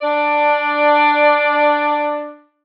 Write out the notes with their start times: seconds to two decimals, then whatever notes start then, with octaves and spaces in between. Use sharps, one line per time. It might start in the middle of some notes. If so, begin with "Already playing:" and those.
0.02 D4 D5